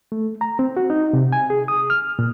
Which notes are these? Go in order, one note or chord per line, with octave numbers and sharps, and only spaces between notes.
A3
A#5
C4
F#4
D#4
C3
G#5
G#4
D#6
F6
A#2